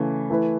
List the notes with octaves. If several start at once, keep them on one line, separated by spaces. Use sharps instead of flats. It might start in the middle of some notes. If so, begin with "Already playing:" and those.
Already playing: C#3 E3 A3
E3 A3 E4 B4